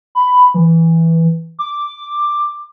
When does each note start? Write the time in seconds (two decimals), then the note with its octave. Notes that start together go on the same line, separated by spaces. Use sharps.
0.15 B5
0.54 E3
1.59 D6